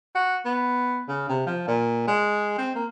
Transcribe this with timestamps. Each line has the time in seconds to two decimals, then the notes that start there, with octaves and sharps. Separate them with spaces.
0.15 F#4
0.45 B3
1.09 C#3
1.29 C3
1.46 F3
1.67 A#2
2.08 G#3
2.58 C4
2.75 A#3